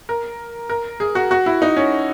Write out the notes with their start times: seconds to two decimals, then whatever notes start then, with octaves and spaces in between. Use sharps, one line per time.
0.09 A#4
0.70 A#4
1.00 G#4
1.15 F#4
1.31 F#4
1.46 E4
1.62 D#4
1.77 C#4